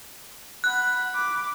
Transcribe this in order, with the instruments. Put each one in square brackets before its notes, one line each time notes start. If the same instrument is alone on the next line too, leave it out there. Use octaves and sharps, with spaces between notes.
[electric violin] F#5 B5 [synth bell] F#6
[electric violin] B5 D6